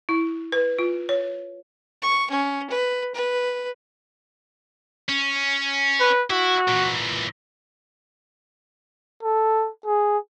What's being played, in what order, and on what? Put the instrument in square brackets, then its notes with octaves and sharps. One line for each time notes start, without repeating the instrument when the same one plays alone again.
[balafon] E4
B4
F4
C#5
[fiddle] C#6
C#4
B4
B4
[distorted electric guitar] C#4
[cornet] B4
[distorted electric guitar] E4 [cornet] F#4
[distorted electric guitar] A#2 E3
[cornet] A4
G#4